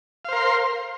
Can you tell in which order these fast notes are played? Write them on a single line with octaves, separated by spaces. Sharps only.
F5 C5 A#4 C6